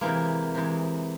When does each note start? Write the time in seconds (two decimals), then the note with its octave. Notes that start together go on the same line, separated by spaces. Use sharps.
0.01 C3 E3 G#3 A#3
0.55 C3 E3 G#3